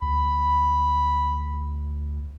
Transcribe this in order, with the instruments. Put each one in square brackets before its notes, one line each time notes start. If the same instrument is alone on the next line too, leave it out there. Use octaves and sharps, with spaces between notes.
[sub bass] D2 [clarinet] B5